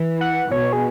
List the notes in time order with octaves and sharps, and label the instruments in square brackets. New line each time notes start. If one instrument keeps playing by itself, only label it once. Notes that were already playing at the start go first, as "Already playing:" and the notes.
Already playing: [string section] E3
[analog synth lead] F#5
[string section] B2 [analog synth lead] C#5
[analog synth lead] G#4